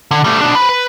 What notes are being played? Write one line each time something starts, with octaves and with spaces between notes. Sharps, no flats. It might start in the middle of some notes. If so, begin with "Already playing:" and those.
D3
G3 A3
B2 D4
B4 C5
B4